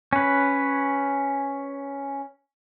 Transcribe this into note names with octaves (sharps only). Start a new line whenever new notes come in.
C#4 B4